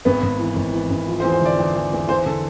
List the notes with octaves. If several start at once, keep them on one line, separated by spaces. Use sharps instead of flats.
G#1 B3
G#1
E3
G#1
E3
G#1
F3
C5
E2
C5
D3 D5
E2
E2
E2
E2 C5
D3 A4